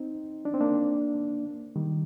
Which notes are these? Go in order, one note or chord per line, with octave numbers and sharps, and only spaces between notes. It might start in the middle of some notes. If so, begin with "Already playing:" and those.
Already playing: C4 D#4
D4
C4
A#3 D4
D#3 G3